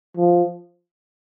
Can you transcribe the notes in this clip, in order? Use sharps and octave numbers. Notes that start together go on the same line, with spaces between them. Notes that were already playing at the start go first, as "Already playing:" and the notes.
F3